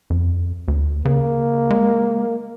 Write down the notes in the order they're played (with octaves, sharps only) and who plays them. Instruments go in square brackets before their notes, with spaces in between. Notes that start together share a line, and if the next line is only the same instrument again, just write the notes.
[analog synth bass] F2
D2
[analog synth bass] C#3 [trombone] A#3
[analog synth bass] G#3